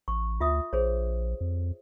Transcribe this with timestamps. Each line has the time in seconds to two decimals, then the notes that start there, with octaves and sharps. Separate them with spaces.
0.08 A1 C#6
0.40 D2 F4 E5 D#6
0.73 A#1 G#4 C5 C#5
1.41 F2